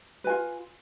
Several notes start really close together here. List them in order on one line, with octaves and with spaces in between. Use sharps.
B4 G#5 F4